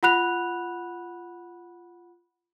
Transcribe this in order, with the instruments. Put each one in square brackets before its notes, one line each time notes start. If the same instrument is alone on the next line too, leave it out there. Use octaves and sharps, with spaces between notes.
[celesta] F4 F#5 B5 F#6 F7